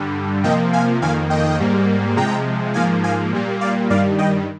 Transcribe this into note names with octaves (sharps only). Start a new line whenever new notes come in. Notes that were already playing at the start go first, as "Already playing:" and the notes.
Already playing: G2 D3 G3
C3 F3 A#3 D#5 G5
F5 G#5
F2 D#3 A#3 F5 G#5
D#5 G5
G#2 G3 A#3
C3 F3 G#3 G5 A#5
G#2 F3 A#3 F5 G#5
F5 G#5
A#2 G3 A#3
D5 F5
G2 D#3 G3 D5 F5
D#5 G5